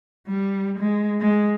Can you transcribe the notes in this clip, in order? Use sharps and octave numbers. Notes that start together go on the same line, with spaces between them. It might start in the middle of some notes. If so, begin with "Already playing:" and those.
G3
G#3
G#3